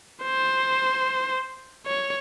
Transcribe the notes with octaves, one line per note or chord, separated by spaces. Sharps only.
C5
C#5